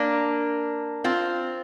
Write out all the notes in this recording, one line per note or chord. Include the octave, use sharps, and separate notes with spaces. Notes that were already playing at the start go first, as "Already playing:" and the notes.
Already playing: A#3 D4
C4 F4